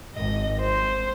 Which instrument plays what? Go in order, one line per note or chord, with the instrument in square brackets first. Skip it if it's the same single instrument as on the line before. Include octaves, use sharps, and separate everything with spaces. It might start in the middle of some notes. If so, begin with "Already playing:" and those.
[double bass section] G#1 [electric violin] D#5
[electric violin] C5